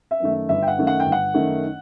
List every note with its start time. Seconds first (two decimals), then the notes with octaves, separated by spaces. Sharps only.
0.11 E5
0.20 F#2 D#3 A3
0.49 G1 E5
0.63 G5
0.68 F#5
0.78 F#2 D#3 A3
0.87 F#5
1.00 G5
1.05 G1
1.12 F#5
1.34 F#2 D#3 A3